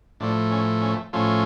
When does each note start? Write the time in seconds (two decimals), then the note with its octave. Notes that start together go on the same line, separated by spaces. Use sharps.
0.20 A2 F3 A3 D4
0.51 C#4
0.82 C#4
1.13 A2 F3 A3 C#4 F4